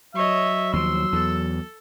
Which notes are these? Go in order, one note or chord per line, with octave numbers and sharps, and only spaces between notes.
F#3 C#5 D#5 E5
D#2 F3 C6 E6
E2 A4